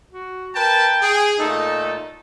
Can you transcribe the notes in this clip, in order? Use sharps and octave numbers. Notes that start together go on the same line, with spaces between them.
F#4
A#4 B4 G5 A5
G#4
A#2 A3 D#4 A4